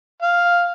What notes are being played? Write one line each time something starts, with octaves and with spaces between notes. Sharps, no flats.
F5